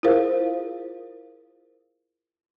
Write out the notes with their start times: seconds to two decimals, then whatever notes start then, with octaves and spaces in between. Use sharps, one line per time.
0.03 E4 F4 G#4 A#4 C5 F5